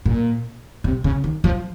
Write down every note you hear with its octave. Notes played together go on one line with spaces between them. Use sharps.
A#2
C3
C#3
D#3
F3